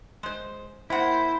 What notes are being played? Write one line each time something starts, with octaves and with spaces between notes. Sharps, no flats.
G#3 C5
A#3 C4 E4 C5 F#5